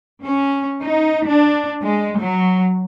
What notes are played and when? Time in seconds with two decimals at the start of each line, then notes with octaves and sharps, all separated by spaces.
0.24 C#4
0.82 D#4
1.27 D4
1.82 G#3
2.20 F#3